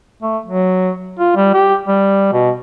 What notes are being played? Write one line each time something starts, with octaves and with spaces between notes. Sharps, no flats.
A3
F#3
F4
G3
G4
G3
B2